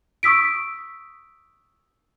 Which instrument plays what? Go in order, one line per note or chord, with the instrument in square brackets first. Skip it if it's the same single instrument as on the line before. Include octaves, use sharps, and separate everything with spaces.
[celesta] C#6 D#6 E6 B6 D7